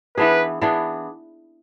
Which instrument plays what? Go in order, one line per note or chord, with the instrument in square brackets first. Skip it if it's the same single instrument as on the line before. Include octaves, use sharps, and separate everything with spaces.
[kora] E3 B3 D4 G#4 [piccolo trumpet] B4
[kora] E3 B3 D4 G#4